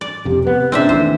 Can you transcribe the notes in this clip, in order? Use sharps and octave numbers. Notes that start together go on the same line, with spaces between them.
D5
F2 C3 G4
C3 B3 B4
A#2 C#3 C4 D4 D#4 E5
D#2 E3 A3 C5